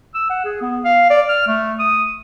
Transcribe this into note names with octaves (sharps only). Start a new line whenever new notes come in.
E6
F#5
G#4
B3
F5
D5
F6
A3
D#6